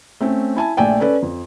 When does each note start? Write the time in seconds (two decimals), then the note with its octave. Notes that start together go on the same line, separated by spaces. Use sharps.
0.21 A3 C4 C#4
0.56 E4 G#5 A5
0.77 A#1 A3 D5 G5 G#5
1.00 C#4 A4 B4 D5
1.22 F2